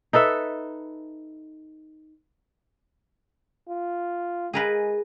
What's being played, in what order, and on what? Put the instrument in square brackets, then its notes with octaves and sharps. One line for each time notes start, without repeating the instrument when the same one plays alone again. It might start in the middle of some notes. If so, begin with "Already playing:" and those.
[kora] D#4 A4 B4 E5
[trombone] F4
[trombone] G#3 [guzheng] G#4 A#4 B4